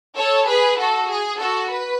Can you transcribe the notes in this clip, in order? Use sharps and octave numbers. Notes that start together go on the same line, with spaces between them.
A4 C#5
G#4 B4
F#4 A4
G#4
F#4 A4
B4